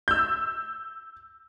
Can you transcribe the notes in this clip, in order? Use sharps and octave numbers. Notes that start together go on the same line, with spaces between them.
E6 G6